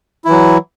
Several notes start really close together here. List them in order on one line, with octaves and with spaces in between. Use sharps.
E4 E3 F#3